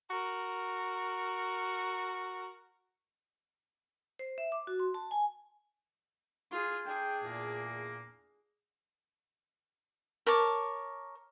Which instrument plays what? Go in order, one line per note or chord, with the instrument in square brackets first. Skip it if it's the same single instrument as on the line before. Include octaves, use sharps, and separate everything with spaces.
[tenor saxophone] F#4 [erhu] A#4
[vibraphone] C5
E5
D6
F#4
C6
A5
G#5
[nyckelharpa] F4 G#4
[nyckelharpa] D4 G#4 [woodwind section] G5
[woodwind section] E2 A#2 A#3
[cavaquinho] A#4 C#5 A5 D6